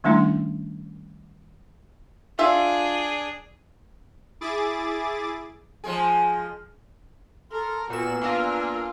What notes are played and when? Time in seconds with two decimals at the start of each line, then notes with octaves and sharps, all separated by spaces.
0.04 D#3 G3 A3 C#4 D4 E4
2.39 D4 F4 G#4 E5 F5
4.41 E4 G#4 D6 A6
5.84 F3 G#3 G#4
7.51 A4 A#4 C6 F6
7.90 A#2 B3 F#4 G#5 E6 F6 E7
8.21 A#3 D4 F4 A#4